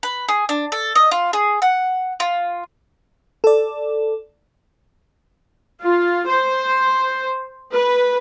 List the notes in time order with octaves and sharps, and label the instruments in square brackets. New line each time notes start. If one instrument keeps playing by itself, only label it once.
[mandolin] B4
G#4
D4
A4
D#5
F4
G#4
F#5
F4
[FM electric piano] A4 D5
[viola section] F4
C5
B4